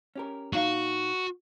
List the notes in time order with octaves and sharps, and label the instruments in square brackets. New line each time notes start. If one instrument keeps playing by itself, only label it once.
[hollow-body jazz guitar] C#4 G4 A#4
[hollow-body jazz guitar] A#2 D#4 F5 [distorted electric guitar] F#4